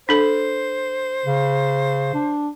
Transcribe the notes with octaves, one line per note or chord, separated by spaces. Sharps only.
D4 A4 C5
C#3
D4